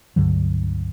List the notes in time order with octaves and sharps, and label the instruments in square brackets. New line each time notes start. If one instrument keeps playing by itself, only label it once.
[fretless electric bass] C#2 G2 D3 F#3